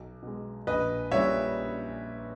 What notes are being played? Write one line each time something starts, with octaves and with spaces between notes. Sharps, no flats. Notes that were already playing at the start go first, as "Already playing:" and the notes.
Already playing: B1
B2 G#3
A#1 B4 D#5
A#2 G3 C#5 E5